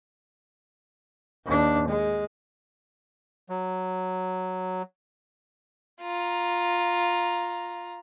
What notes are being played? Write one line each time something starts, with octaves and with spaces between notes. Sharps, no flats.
D#2 D4
G#3
F#3
F4 A#5